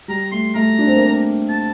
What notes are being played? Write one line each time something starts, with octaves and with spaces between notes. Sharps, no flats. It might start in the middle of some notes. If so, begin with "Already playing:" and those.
G3 A#5
A3 C6
A3 A#5
D4
C4
A#3
C4
A5